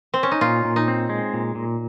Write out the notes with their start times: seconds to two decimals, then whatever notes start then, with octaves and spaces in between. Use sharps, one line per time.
0.14 C4
0.23 C#4
0.31 D#4
0.41 A#2 F4
0.65 A#2
0.76 D#4
0.88 C4
1.09 G#3
1.33 A#2
1.55 A#2